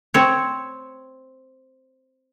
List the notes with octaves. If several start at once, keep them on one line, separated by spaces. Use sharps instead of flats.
C4 C#5